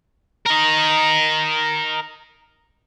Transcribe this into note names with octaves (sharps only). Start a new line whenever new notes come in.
A#4 D#5